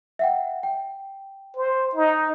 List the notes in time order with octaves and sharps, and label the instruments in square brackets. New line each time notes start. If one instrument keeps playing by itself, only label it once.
[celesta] E5 F#5 G5
G5
[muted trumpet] C5
D#4